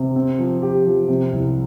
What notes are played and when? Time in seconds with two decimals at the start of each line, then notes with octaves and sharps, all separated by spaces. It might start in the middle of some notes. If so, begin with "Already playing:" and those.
Already playing: C3
0.16 C4
0.39 F3
0.62 G4
0.85 F3
1.08 C3
1.33 C2